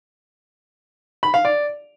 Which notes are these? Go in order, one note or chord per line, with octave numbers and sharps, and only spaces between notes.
B5
F5
D5